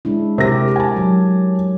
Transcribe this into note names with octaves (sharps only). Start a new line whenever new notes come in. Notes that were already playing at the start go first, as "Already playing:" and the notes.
G#3 D4 E4
C3 G4 A#4 A#6
G#5 A5
F#3